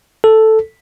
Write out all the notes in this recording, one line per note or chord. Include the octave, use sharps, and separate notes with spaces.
A4